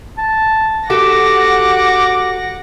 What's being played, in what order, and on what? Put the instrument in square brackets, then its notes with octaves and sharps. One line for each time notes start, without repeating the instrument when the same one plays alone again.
[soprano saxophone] A5
[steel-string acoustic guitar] F#4 G4 A4 [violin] F#5 A#6 [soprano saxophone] D6